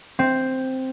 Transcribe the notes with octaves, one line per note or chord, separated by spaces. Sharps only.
C4